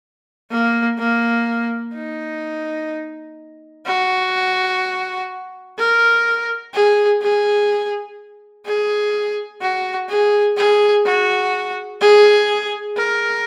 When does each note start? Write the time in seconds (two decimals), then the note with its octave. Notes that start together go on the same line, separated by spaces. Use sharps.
0.51 A#3
0.99 A#3
1.95 D#4
3.87 F#4
5.78 A#4
6.74 G#4
7.22 G#4
8.66 G#4
9.61 F#4
10.10 G#4
10.57 G#4
11.06 F#4
12.01 G#4
12.97 A#4